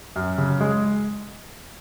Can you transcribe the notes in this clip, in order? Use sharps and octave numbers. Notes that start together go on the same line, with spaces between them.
F#2
C#3
G#3